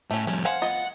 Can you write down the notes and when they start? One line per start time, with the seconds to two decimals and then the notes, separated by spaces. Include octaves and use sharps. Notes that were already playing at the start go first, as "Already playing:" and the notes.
0.11 A2 A3 C#4
0.27 F2 G3 C#4
0.45 C5 F5 F#5 G#5
0.62 B3 F4 D#5